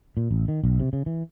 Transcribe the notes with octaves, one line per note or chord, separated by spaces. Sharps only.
A#2
A1
D#3
B1
C3
C#3
E3